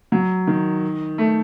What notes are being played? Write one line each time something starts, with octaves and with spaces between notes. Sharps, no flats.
F#3
D#3
A3